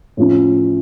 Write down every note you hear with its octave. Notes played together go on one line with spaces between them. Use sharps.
A2 F3 C#4